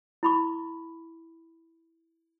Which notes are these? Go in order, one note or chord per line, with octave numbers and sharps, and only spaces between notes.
E4 B5 C#6